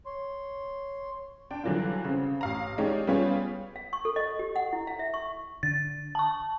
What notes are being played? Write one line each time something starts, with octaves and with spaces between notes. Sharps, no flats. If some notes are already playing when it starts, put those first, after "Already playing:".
C#5 C6
D4 G5
D3 E3 F#3 G3 F4
C#3 C4
A1 F5 A#5
G#3 D#4 G4 G#4 C#5 D5
G3 B3 C#4 F4 G#4 C#5
F5
C#6
A4
D#5
G4
F#5
E4
F5
E5
C#6
D3 A6
A5 C#6